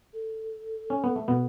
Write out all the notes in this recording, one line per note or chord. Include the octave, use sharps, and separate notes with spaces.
A4
C#4
B3
A3
B2 B3